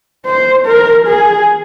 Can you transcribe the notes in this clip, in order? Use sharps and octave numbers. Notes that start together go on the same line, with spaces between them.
C5
A#4
G#4